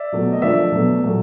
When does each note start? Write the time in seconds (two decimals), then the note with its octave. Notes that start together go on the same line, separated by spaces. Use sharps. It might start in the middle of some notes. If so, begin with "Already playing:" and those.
Already playing: D5 E5
0.12 B2 F#3 A3
0.33 D#5
0.42 D3 F3 A3 D5 E5
0.72 B2 F#3 A3
1.03 A#2 F#3 A3